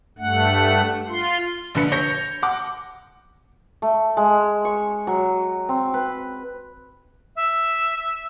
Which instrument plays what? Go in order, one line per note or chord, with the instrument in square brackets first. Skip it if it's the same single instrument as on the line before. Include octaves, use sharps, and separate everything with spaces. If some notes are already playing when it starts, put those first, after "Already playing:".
[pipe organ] G2 A3 F#5
F4 C6
[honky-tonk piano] A#1 D3 B4 C#7
C#5 G6 A#6 C#7
F#5 D6
[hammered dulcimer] A3
G#3
C#6
F#3
C4
B4
[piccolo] E5